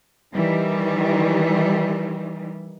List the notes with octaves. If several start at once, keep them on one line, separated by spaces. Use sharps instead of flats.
D#3 E3 G3